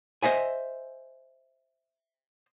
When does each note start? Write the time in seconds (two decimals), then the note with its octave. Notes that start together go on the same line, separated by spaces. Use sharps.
0.23 C5 D#5 E5 G#5